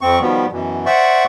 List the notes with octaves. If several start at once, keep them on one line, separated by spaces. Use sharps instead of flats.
F2 C4 C#6
B2 D#3 F3 G3 B3
F#2 B2 E3
C5 D5 E5 F#5 C#6